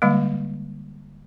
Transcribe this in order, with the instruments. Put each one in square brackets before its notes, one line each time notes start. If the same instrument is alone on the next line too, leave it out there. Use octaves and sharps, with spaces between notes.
[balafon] D3 G3 G#3 A#3